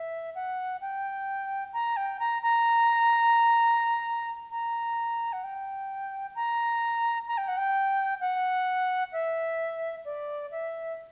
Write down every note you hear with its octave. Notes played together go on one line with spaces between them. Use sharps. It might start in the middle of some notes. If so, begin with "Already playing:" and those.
Already playing: E5
F#5
G5
A#5
G5
A#5
A#5
A#5
F#5
G5
A#5
A#5
G5
F#5
G5
F#5
E5
D5
E5